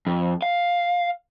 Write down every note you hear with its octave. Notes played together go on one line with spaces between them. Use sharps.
F2
F5